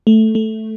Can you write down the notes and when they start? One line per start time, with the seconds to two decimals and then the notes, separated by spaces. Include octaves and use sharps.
0.07 A3
0.35 A3